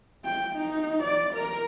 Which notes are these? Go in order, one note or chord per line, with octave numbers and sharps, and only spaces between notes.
G5
D#4
D5
A#4